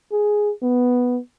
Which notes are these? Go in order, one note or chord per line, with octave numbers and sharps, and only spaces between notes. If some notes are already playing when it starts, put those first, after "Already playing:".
G#4
B3